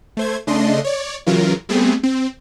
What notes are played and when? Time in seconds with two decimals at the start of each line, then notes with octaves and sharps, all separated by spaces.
0.17 A3 C5 G#6
0.47 C#3 A3 D4 D#5 C6
0.84 C#5 D5
1.26 C#3 E3 F#3 F4 A#4
1.69 G3 A3 B3 C4 G#4
2.03 C4